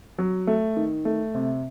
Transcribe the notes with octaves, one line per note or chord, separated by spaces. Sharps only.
F#3
A3
D#3
A3
C3